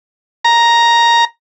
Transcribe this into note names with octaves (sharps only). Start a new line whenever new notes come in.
A#5